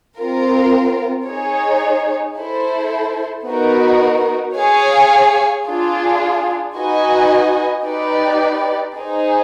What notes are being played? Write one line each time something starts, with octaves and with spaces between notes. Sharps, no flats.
C4 F4 A#4
D#4 G#4 C#5
E4 A4 C5
B3 D#4 F#4 A#4
G#4 C#5 F5 G#5
D4 F4 G#4
D#4 F#4 B4 D#5 G#5
D#4 G4 B4 D5
D#4 G#4 C5